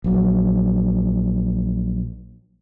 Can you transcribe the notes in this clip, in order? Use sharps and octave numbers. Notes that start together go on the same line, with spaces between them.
A#1 F#3